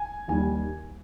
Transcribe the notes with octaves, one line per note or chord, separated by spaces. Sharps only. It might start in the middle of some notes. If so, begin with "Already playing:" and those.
Already playing: G#5
D#2 D#3 G3 G#5